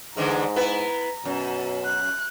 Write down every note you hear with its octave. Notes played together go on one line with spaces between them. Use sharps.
G#2 D3 E3 G#3 A#5
B3 E4 B4
F#2 B2
F#6